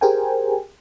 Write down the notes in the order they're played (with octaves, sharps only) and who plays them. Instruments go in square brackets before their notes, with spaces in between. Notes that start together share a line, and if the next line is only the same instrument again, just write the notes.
[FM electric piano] G4 G#4 A#4 C5 G5 G#5